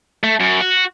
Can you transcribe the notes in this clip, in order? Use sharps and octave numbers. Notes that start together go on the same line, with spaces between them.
A3
F#2
F#4